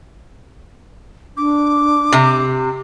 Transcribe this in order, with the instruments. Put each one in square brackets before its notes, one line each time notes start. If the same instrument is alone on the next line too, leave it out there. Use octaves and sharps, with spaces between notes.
[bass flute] D4 [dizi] D6
[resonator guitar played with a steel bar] C3